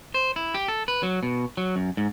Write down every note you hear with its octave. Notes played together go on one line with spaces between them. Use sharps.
C5
E4
G4
A4
B4
F#3
B2
F#3
F#2
G#2